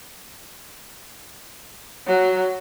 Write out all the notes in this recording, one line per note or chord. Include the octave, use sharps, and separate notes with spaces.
F#3